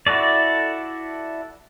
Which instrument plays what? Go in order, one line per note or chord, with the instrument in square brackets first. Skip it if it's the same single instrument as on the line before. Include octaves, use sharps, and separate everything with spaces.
[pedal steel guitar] E4 F#4 A4 D5